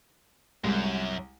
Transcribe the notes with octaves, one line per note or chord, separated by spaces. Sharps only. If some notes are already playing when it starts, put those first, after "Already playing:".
C2 F#2 G3 G#3